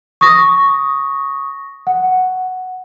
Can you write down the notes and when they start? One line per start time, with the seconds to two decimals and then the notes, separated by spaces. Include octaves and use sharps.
0.21 C#6 D#6 A#6
1.87 F#5